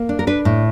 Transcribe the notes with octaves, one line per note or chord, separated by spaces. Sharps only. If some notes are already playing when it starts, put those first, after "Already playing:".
Already playing: A#3
D4
A#4
D4 B4
A2